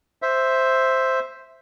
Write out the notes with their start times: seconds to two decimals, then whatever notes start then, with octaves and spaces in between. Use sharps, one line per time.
0.22 C5 E5